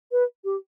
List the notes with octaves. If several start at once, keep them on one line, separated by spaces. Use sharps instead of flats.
B4
G4